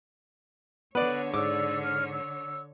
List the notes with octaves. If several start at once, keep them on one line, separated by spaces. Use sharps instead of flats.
D3 B3 B4 C#5 D5
G#2 D5 D6 E6
F6
E6